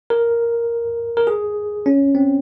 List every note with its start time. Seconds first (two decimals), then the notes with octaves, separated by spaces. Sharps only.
0.10 A#4
1.17 A#4
1.27 G#4
1.86 C#4
2.15 C4